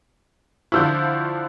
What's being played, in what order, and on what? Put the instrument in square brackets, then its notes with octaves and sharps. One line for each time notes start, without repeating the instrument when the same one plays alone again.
[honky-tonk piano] D3 F3 E4 [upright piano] C#6 E6 G6